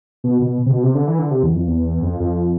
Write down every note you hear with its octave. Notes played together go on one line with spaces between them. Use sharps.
B2
B2
C3
B2
C3
D3
E3
D3
C3
E2
F2
E2
F2
F2